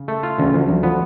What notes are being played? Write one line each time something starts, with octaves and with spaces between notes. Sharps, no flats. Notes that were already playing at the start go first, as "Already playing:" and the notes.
Already playing: C#3
A3
F4
D2 C#3
D2 F3
D2 F#3
F3 B3